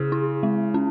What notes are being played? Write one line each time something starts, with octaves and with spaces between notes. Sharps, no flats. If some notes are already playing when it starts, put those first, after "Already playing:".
Already playing: C#3 E4 G#4
E4
G#3
C#4